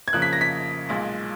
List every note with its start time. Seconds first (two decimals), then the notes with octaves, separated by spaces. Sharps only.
0.08 G#6
0.13 F2 C#3 F3 A#3 F#6
0.22 B6
0.33 A#6
0.41 B6
0.89 B1 A#2 G#3